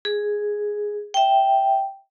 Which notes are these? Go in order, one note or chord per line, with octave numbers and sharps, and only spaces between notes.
G#4
E5 G5